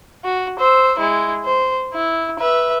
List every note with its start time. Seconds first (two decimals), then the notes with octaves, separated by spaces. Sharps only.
0.24 F#4
0.59 C5 E6
0.99 G#3 E4
1.45 C5
1.94 E4
2.40 B4 E5